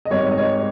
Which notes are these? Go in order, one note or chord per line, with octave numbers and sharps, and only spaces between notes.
D#5
G#1 G#2 G3 C#5
D#5
C#5